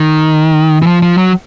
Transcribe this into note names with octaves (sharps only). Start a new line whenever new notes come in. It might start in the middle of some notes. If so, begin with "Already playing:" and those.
Already playing: D#3
E3
F3
F3
F#3